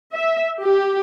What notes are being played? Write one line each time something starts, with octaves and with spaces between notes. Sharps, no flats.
E5
G4